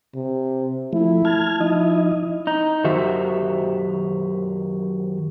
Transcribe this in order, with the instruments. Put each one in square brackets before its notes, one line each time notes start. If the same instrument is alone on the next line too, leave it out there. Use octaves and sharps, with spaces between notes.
[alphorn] C3
[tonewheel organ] F3 A3 [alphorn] E4
[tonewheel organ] A5 F6 G#6
[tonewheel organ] F3 D#4 D#5 [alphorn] E4
[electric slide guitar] D#4
F#2 D#3 F#4 G4 C5 E5